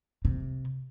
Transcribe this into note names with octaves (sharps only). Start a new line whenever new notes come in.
C3